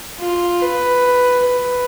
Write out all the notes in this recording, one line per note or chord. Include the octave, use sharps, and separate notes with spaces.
F4
B4
B4